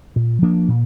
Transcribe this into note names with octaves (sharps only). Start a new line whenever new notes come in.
A#2
F3 A#3 D4
A#2